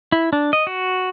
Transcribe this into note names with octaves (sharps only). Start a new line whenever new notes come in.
E4
D4
D#5
F#4